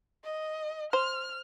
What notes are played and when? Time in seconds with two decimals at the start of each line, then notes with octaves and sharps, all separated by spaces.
0.24 D#5
0.93 C5 F6